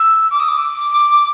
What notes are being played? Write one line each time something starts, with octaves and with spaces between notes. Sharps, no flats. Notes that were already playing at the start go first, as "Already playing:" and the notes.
Already playing: E6
D6
D#6
D6